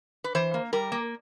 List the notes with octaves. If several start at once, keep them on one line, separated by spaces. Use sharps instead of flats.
B4
E3 C5
A#3
G3 A#4
A#3